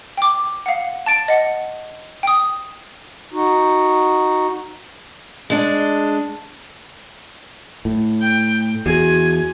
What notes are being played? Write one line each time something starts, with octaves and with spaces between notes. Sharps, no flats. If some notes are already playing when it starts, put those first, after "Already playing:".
G5 D6
F5 F#5
A5 A6 D7
D#5 F#5
G5 D#6
D#4 F#4
G#3 D4
A2
G5
E2 F#4 G#4 G#5